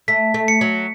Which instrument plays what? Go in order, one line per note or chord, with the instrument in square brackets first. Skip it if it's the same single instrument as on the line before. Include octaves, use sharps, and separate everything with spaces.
[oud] A3 [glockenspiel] B6
[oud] A3
[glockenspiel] C#7
[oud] F#3